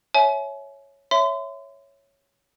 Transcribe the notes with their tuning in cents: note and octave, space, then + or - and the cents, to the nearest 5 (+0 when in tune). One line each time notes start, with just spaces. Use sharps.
C#5 +0 E5 -5 G#5 +40
C#5 +0 E5 +0 C6 -35